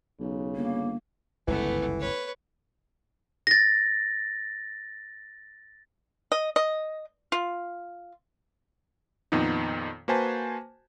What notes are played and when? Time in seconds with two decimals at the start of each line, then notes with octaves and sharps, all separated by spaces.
0.19 B1 C#3
0.56 G1 A#3
1.48 G1 C#2 F#2 E3 A3 B3
2.00 B4 C#5
3.47 A6 A#6
6.32 D#5
6.56 D#5
7.32 F4
9.32 F2 A#2 D#3 B3 D#4
10.08 A#3 F#4 B4 C5 G#5 A5